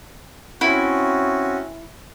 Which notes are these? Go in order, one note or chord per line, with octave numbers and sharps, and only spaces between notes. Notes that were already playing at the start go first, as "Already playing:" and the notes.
C4 C#4 E4 F#4